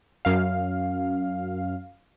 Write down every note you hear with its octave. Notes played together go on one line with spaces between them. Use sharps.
F#2 F5